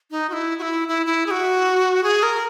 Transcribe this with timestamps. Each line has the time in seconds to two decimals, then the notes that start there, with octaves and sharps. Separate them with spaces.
0.11 D#4
0.29 F#4
0.33 E4
0.59 F#4
0.62 E4
0.88 E4
1.06 E4
1.26 G#4
1.31 F#4
2.03 G#4
2.23 A#4